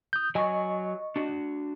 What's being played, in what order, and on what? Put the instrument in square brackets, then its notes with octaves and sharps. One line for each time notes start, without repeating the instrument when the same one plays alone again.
[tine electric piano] D#6 G6
[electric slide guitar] F#3 G#5 [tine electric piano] D#5 C#6
[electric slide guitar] D4 F#4